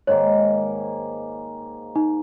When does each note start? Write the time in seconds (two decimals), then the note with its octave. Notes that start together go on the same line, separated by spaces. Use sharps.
0.07 G#2 D#3 A#3 C#5
1.96 D#4